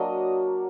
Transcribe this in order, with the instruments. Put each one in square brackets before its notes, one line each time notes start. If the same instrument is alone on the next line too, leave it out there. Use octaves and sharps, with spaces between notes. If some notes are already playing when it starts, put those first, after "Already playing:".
Already playing: [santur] F#3 A#3 D4 D#5